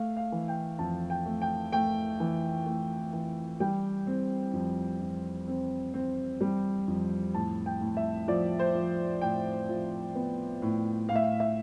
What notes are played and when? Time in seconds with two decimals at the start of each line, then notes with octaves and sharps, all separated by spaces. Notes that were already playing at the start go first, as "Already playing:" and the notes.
Already playing: A3 F5
0.17 F5
0.32 E3
0.48 G5
0.79 F2 A5
1.10 G5
1.26 A3
1.42 G5
1.72 A3 G5
2.20 E3
2.66 A3
3.13 E3
3.60 G3 G5
4.07 C4
4.53 F2
5.00 F2
5.48 C4
5.94 C4
6.41 G3
6.88 F2
7.34 A2 A5
7.66 G5
7.81 A2
7.97 E5
8.28 F3 D5
8.59 C5
8.75 F3
9.21 A2 G5
9.69 F3
10.15 B3
10.62 A2
11.09 A2 F5
11.16 E5
11.23 F5
11.40 E5